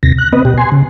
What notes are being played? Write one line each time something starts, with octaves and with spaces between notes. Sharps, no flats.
D#2 C3 A#6
F#6
B3 C4 B4 D#5
B2 G4
G#5 C6
C#3